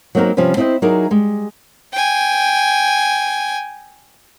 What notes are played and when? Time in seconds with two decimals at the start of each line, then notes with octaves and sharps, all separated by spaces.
0.15 F#3 A#3 C4 D#4 F#4 A#4
0.37 C3 F3 G3 C#4 B4
0.57 C4 E4 C5 D5 D#5 G5
0.82 F#3 D#4 E4 G#4 A#4 D5
1.11 G3 G#3
1.93 G5 G#5